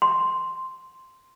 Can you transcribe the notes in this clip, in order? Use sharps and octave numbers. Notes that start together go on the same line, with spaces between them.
C6